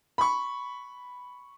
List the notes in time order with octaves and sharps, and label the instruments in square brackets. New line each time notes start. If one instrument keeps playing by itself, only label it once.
[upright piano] B5 C#6